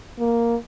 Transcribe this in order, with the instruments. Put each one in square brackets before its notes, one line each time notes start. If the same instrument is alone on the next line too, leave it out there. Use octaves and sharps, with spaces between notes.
[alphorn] A#3